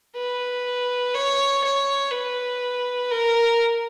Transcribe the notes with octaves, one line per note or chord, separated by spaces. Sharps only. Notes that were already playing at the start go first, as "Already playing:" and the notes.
B4
C#5
C#5
B4
A#4